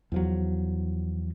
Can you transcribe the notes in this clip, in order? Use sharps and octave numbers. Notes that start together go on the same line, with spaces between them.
E2 F3 F#3